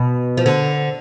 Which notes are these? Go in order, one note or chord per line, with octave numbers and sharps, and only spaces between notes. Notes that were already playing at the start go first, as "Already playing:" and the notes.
Already playing: B2
F3
D3